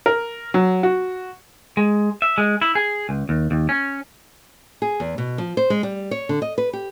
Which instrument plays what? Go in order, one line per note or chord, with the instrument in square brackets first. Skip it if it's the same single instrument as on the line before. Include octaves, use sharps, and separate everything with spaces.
[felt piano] A#4
F#3
F#4
[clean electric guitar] G#3
E5
G#3
E4
G#4
C#2
D#2
D#2
C#4
[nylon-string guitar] G#4
E2
B2
F3
C5
G#3
G3
C#5
D3
D#5
B4
G4